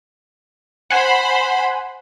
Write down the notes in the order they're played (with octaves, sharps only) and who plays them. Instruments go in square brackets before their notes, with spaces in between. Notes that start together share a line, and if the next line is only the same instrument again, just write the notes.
[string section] C5 B5 [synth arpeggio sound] F#5 G#5 C6